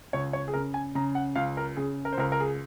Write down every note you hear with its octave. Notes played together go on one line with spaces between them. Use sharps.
C#2 C#5
C#5
G#4
C#3 A#4
G#5
C#3 A#5
F#5
C#2 F5
A#4
C#3 G#4
A#4
C5
C#2 A#4
A#4
G#4